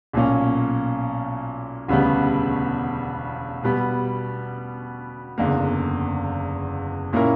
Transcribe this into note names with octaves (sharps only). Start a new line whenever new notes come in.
B1 A#2 A#3 C#4
E1 D2 C#3 G3 B3
B2 G3 B3
F#1 E2 D3 A#3
A#2 A#3 C#4 E4 A#4